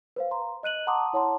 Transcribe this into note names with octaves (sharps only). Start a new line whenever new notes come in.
B4 C5 F5
A#5 C6
D#5 F#6 D#7 F#7
F#5 A5 A#5 C6 D6 D#6
E4 C#5 F#5 A5 A#5 C6